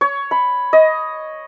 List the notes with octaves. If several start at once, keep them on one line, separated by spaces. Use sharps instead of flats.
C#5
B5
D#5